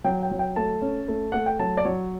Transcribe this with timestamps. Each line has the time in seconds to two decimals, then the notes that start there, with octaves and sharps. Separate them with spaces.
0.04 F#3 G5
0.23 G5
0.31 F#3
0.39 G5
0.56 A3 A5
0.82 C#4
1.08 A3
1.32 A3 F#5
1.46 G5
1.59 F#3 A5
1.77 D5
1.85 F#3 C#5